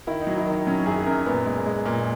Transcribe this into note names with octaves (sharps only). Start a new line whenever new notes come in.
D#3 E4
D#4
F#3
E4
D#3 D#4
F#3 C#4
F#2 G#4
F#2 A#4
A#2 B3
G#3
G#3
A#2